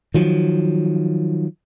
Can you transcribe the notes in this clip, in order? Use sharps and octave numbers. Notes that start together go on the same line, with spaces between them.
D#3 F3 F#3